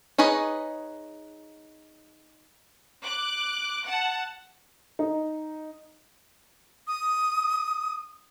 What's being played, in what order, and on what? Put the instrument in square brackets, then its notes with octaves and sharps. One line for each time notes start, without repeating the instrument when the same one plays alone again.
[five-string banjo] D#4 G#4 B4 C#5 D#5
[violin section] D6 F#6
F#5 A5
[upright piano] D#4
[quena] D#6